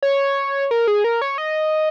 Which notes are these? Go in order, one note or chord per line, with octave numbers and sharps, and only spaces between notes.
C#5
A#4
G#4
A#4
C#5
D#5